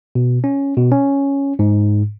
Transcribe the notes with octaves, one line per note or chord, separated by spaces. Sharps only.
B2
C#4
B2
C#4
G#2